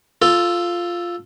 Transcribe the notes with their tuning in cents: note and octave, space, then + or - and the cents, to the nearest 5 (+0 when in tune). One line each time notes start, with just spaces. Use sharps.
F4 +0 A4 +0